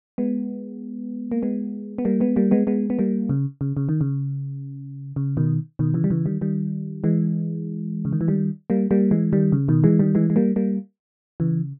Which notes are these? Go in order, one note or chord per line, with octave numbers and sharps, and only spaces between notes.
G#3 B3
A#3
G#3 B3
B3
G3 A#3
G#3 B3
G3 A#3
G#3 B3
G#3 B3
B3
G3 A#3
C#3
C#3
C#3
D#3
C#3
C#3
B2 D#3
B2 D#3
C#3 E3
G3
C#3 E3
D#3 G3
D#3 G3
E3 G#3
C#3
D#3
E3
D#3 G3
G3 A#3
G3 A#3
E3 G#3
D#3 G3
C#3
B2 D#3
E3 G#3
D#3 G3
E3 G#3
G#3
G3 A#3
G3 A#3
C#3 E3